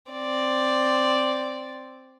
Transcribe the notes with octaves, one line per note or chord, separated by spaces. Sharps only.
C4 D5